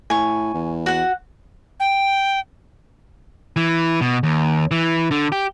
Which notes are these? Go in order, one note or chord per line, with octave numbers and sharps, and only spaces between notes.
A2 G#5 C#6
E2
F#4 F#5
G5
E3
B2
D#2
E3
D3
G4